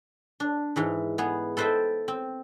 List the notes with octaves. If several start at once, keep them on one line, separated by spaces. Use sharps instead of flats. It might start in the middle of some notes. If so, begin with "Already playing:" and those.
D4
G#2 E3 D#4
B3 G#4
A4 B4 C5 D#5 E5 G5
C4